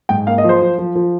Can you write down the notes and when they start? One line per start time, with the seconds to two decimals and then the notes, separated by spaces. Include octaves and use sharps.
0.09 G#2 G5
0.27 A#3 F5
0.38 D#5
0.44 F3 C5
0.62 F3
0.78 F3
0.95 F3